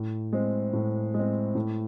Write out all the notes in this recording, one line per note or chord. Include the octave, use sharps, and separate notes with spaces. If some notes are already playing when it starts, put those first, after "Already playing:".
Already playing: A2
G#3 C4
A2
G#3
C4
A2